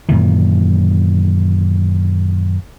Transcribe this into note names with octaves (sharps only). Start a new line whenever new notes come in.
F#2 A#2 D#3 E3